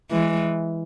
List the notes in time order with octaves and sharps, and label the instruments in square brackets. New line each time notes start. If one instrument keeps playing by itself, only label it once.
[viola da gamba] E3 G#3